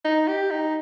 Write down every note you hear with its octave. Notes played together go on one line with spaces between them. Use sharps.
D#4
G4
D#4